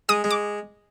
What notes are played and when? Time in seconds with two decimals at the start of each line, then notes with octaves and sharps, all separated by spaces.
0.09 G#3 D#6
0.24 G#3
0.31 D6